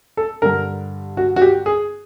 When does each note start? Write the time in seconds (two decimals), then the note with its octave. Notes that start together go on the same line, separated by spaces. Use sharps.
0.17 A4
0.42 G2 D3 A#4
1.17 F#4
1.36 F#4
1.42 G4
1.66 G#4